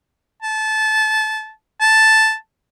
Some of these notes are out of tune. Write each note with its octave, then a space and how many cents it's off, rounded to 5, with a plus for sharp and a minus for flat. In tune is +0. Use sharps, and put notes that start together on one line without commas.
A5 -20
A5 +0